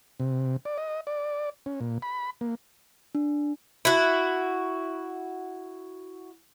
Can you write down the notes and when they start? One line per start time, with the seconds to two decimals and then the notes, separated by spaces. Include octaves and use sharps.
0.20 C3
0.65 D5
0.78 D#5
1.07 D5
1.66 C#4
1.81 A#2
2.02 B5
2.41 A#3
3.15 D4
3.85 E4 F#4